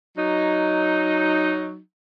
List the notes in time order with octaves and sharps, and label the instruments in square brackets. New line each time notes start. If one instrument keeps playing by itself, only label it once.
[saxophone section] F#3 D#4